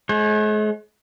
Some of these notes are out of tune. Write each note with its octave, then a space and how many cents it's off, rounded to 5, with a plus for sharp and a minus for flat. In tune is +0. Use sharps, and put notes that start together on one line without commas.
G#3 +40 C#5 -45